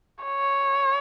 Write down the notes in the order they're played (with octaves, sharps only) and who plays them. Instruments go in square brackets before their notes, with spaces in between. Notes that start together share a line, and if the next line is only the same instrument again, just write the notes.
[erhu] C#5